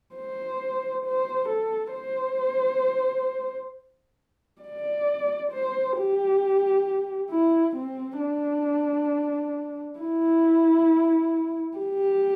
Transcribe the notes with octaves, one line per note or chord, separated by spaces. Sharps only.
C5
C5
A4
C5
D5
C5
G4
E4
C4
D4
E4
G4